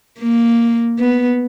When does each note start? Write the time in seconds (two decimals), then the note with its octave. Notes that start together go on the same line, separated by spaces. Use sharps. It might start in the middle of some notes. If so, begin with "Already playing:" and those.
0.20 A#3
0.99 B3